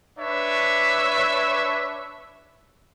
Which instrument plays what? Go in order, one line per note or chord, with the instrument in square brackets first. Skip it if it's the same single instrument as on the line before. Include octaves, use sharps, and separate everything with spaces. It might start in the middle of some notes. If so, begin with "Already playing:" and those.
[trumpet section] D4 B4 C#5 E5